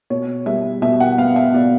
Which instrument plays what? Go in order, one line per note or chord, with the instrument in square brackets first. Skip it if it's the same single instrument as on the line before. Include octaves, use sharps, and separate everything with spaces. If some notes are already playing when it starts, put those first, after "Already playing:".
[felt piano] B2 C#5
G3 E5
B2 E5
F#5
B3 F5
E5
B2 D5